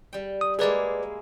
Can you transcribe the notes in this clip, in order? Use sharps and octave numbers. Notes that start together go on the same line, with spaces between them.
G3 G5
D#6
G#3 A#3 E4 G#4 B4 D5